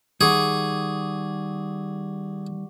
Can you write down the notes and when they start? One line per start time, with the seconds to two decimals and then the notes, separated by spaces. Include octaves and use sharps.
0.21 D#3 G3 G#4 F#5 C#6 D6